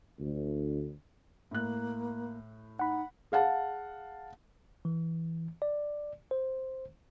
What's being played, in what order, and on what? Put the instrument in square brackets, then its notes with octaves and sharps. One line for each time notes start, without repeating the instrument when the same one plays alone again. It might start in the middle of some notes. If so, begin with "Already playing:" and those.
[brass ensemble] D2
[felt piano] A2 F#6 [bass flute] A#3
[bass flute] D#4 [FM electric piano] F#5 B5
[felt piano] G#4 F5 F#5 A5
[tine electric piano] E3
D5
C5